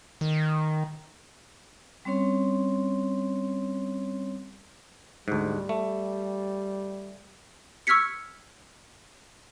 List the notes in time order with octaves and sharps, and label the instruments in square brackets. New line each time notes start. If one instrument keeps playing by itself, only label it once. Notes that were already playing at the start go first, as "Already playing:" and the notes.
[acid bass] D#3
[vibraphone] G3 C4 C#4 C#5 C6
[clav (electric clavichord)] D2 G#2 [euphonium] G3
[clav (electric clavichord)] A3
[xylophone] C#6 E6 F6 G#6 B6 C#7